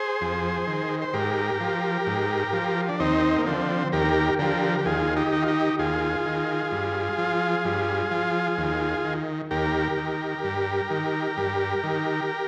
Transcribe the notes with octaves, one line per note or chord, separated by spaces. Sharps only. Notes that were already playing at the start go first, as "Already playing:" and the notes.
Already playing: G#4 C5
F2
D#3
C5
G#2 G4 A#4
F3
G#2
F3
D4
D#2 C4 D#4
A#3
D3 F3 C4
D#2 G4 A#4
D3 F3 G4 A#4
G4
D#2 F4 G#4
D#4 G4
D#3
F4
D#4 G4
D#2 F4 G#4
D#3
G2
F3
G2
F3
D#2
D#3
D#2 G4 A#4
D#3
G2
D#3
G2
D#3